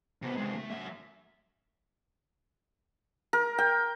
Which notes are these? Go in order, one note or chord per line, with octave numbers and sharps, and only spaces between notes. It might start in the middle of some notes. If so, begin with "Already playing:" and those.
C3 B3
C3 G#3
A3
F#3 E5
A#4
G5